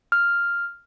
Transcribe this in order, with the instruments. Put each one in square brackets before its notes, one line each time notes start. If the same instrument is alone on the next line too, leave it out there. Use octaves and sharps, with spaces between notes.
[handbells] F6